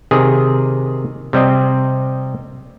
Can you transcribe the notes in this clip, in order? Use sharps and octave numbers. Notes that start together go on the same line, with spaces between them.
C3 D#3 G#4
C3 G3 C4 D#5